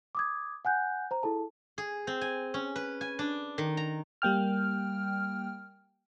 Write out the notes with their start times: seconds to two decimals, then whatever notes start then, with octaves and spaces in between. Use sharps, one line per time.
0.15 D6 D#6 G#6
0.65 F#5 G#5 F#6 G6
1.11 C5 A#5
1.23 E4 G#4 A4 A5
1.78 G#4
2.07 C4
2.21 G#5
2.54 C#4
2.76 B4
3.01 G#5
3.19 D4
3.58 D#3
3.77 A#5
4.22 G3 A#3 G5 F6